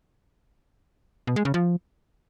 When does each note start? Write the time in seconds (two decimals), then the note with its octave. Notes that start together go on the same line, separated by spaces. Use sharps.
1.27 B2
1.36 G#3
1.45 C#3
1.54 F3